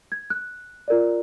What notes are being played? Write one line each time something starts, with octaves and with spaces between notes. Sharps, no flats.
G#6
F#6
F4 A#4 D5